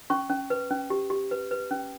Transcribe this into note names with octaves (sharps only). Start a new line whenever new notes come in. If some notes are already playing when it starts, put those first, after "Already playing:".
C#4 C#6
C#4
B4
C#4
G4
G4
B4
B4
C#4